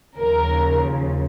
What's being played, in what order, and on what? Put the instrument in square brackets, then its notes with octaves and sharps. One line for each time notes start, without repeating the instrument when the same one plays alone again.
[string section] D#2 C#3 F3 A#4